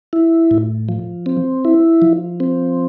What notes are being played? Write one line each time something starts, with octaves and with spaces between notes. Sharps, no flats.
E4
A2
F3
C4
E4
F3
C4